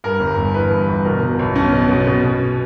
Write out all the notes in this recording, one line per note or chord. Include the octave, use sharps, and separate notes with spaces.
G2 A#4
G1
G1
E3 B4
G2
G1
B2 A#4
B2
B1
B1 C#4
B2
B2
B2
B2